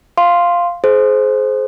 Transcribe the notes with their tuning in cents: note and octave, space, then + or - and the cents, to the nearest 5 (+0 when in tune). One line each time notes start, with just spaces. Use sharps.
F5 +0 C6 +0
G#4 +35 C5 +0